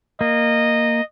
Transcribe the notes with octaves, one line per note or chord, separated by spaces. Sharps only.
A#3 D#5